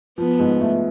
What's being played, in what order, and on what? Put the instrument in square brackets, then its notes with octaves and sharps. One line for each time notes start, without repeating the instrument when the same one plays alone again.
[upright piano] F3 [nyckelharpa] B3
[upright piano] G#2
A3